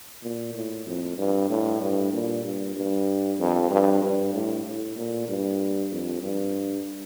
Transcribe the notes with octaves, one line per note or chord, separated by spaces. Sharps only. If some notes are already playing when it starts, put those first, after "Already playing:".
A#2
A2
F2
G2
A2
G2
A#2
G2
G2
F2
G2
G2
A2
A2
A#2
G2
F2
G2